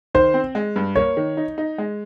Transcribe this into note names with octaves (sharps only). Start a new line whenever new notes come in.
D#3 C5
C4
G#3
G2
A#3 C#5
D#3
D#4
D#4
G#3